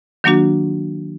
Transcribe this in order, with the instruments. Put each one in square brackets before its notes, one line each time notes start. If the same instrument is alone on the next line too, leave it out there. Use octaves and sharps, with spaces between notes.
[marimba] D#3 F#3 A#3 D4 F#4